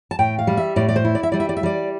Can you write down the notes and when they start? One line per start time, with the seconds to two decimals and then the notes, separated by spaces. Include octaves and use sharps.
0.11 A5
0.19 A2 G5
0.39 F5
0.47 G3
0.57 E5
0.76 A2 D5
0.88 D5
0.96 C5
1.05 E4
1.15 D5
1.23 E5
1.32 G3 D5
1.40 E5
1.49 D5
1.57 E5
1.63 G3 D5